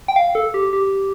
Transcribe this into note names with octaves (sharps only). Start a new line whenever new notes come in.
G5
F5
A4
G4
G4